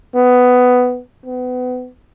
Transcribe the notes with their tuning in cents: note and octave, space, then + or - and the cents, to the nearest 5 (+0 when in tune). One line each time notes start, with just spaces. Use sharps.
B3 +10
B3 +30